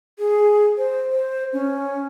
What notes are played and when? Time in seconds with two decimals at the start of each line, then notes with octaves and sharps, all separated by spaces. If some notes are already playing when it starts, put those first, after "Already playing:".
0.19 G#4
0.78 C5
1.10 C5
1.53 C#4